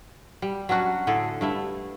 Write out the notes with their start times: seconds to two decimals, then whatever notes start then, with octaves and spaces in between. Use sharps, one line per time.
0.42 G3
0.69 F#3 C#4 D4 F#4
1.07 A2 D3 G#4 A4
1.41 G2 A3 E4